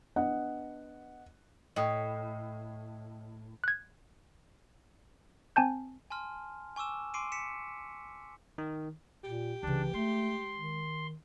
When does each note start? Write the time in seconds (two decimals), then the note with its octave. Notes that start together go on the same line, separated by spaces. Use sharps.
0.16 B3 D4 D#5 F#5
1.76 A2 D#5 G5 D#6
3.64 F#6 G#6
5.56 C4 G#5 A5 G6
6.10 G#5 A5 C6 F6
6.76 G#5 C#6 D6 E6 E7
7.14 G#5 C6 D6 C7 D7 D#7
7.32 B6 C#7 E7
8.58 D#3
9.24 A#2 G4
9.63 C#2 C#3 E3 D4
9.93 G#3 A3 C6
10.56 D#3